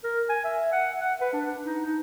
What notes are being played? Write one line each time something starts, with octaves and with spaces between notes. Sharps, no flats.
A#4
G#5
E5
F#5
F#5
B4
D4
D#4
D#4